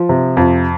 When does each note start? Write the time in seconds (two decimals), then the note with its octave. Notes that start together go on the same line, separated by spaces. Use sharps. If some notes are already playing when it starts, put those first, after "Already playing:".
Already playing: F3
0.09 C3
0.37 F2